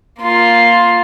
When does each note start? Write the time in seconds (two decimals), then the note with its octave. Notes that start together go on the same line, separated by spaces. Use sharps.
0.21 A#3 F4